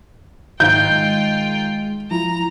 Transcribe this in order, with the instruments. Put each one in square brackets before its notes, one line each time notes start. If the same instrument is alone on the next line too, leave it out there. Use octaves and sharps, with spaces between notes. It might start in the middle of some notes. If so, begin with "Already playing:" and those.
[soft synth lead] G#2 [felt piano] D#3 D#4 [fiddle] F4 G5 [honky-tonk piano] G6
[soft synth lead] G#3
[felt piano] F3 [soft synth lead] E4 [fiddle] A#5